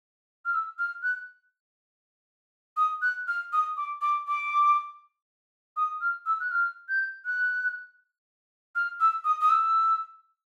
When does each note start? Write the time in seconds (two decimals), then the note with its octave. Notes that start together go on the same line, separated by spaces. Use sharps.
0.45 F6
0.53 E6
0.79 F6
1.03 F#6
2.77 D#6
3.02 F#6
3.28 F6
3.53 D#6
3.77 D6
4.02 D6
4.28 D6
5.77 D#6
6.01 F6
6.26 E6
6.40 F#6
6.51 F6
6.89 G6
7.25 F#6
8.76 F6
9.00 E6
9.25 D#6
9.41 D#6
9.49 E6